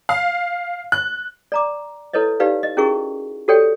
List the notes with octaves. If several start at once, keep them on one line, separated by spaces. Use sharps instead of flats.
F5
F#6
D5 A#5 D6
E4 A4 B4 C#5 D#5
D#4 G4 B4 D5 F5
D#5
C#4 E4 F#4 G#4 A#4 C#6
F#4 G4 A4 C#5 D5 G5